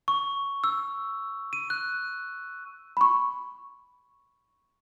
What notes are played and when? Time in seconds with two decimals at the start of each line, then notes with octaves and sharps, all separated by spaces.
0.08 C#6
0.64 E6
1.53 D#7
1.70 F#6
2.97 B5 C#6